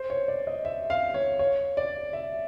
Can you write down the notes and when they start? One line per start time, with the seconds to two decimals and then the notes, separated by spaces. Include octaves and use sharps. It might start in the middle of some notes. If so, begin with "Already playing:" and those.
Already playing: C5
0.10 C#5
0.28 D5
0.47 D#5
0.65 E5
0.90 F5
1.14 C#5
1.39 C#5
1.77 D5
2.13 E5